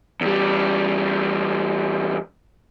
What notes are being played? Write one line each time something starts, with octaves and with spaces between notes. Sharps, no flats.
E2 G3